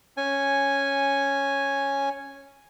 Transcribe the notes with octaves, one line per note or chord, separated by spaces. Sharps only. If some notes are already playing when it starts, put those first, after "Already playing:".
C#4 G#5